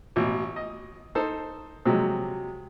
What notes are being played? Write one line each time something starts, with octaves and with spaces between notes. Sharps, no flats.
A1 B2
D#5
D#4 A4 C5
C3 F3 F#3 G#3